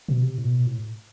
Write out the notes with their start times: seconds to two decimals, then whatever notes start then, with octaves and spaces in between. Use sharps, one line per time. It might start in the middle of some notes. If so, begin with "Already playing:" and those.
0.08 B2
0.22 C3
0.38 A2
0.45 B2
0.66 A2